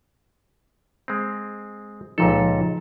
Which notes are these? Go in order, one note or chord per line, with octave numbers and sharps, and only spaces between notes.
G#3 C4
C#2 A#2 F3 D#4 A4